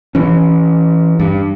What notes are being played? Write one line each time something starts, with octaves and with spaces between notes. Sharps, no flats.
E3 C#4
G2